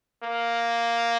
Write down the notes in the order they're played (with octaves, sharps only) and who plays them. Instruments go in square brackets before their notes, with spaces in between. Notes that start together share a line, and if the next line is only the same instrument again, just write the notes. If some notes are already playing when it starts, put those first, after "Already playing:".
[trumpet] A#3